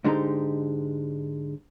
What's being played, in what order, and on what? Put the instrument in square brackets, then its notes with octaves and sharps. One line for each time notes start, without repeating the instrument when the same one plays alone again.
[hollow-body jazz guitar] G#2 D3 G#3 D#4 G4 A#5